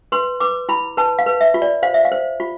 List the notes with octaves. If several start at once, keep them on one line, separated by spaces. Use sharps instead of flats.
B4 C6
B4 D6
E4 B5
B4 A5
F5
B4
E5
F4
D5
C5 F5
E5
F5
C5
F4